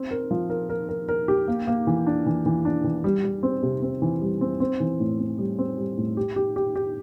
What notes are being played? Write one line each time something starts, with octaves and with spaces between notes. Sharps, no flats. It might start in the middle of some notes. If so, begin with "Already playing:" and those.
Already playing: C4
A#4
F3
A#4
A#4
A#4
A#4
G4
A#3
A#3
E3
D4
E3
E3
D4
E3
G3
G3
C4
C3
C4
E3
G3
C4
C4
E3
A2
C4
G3
C4
G3
A2
G4
G4
G4
G4